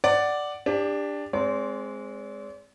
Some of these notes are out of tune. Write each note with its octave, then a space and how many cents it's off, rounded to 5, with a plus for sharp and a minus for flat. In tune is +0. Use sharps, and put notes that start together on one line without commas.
D5 +0 F#5 +10
D4 +0 G4 +30
G#3 +0 C4 +0 D5 -45